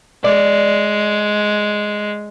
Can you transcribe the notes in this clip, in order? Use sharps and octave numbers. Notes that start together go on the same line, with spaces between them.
G#3 D5